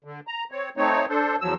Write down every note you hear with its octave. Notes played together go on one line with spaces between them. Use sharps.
D3
A#5
C4 C#5
A3 C4 D#4 C#5
D4 A4 C5
E2 F3 F#3 E6